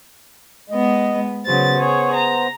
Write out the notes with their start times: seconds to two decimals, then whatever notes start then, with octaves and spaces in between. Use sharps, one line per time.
0.70 G#3 B3 D#5
1.45 C#3 F#3 B3 C5 A6
1.76 G#4 C#5
2.13 A#5